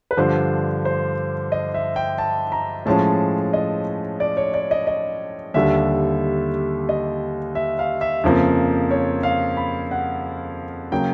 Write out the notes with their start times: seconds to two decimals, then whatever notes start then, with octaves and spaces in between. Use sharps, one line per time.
0.11 B4
0.17 G2 D3 F3 C5
0.85 C5
1.52 D#5
1.74 E5
1.96 G5
2.18 A5
2.52 A#5
2.86 A2 F3 G#3 C#4 A5
3.53 D#5
4.20 D5
4.37 C#5
4.54 D5
4.71 D#5
4.87 D#5
5.54 D#2 D3 G3 E5
6.89 D#5
7.55 E5
7.79 F5
8.01 E5
8.24 F2 C#3 F3 A#3
8.91 C#5
9.23 F5
9.57 B5
9.91 F#5
10.92 C#3 F#3 A#3 G5